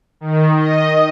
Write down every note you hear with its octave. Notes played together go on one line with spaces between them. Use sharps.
D#3
D#5